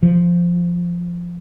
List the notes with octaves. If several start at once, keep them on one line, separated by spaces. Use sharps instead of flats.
F3